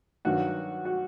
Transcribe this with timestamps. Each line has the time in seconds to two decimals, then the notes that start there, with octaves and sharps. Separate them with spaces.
0.25 G2 D#3 F#3 F#4
0.85 F#4